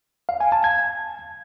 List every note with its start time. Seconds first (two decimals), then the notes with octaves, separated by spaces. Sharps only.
0.29 F5
0.40 G#5
0.52 A5
0.64 G#6